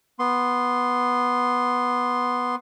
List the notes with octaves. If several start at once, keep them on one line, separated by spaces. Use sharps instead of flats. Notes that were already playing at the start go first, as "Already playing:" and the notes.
B3 C6